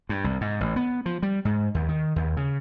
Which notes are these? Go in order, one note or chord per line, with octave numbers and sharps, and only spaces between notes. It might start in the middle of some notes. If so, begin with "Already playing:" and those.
G2
C2
G#2
A1
B3
F3
G3
G#2
D#2
D#3
D#2
C#3